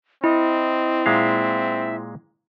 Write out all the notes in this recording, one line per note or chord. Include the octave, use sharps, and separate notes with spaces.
C4 E4 D#5
A#2 G#3 E5 F5